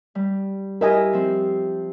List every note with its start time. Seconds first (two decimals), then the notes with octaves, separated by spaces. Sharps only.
0.15 G3
0.81 E4 G4 A#4 D#5 G#5
1.13 F3 C4